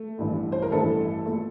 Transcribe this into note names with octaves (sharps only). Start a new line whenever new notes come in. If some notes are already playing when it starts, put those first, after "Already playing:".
Already playing: A3
A1 G2 E3
C5
A#4
A1 G2 E3 A3 A4
A#2 A3